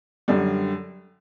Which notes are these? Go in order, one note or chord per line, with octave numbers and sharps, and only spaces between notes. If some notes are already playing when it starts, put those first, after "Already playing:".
F#2 D3 G3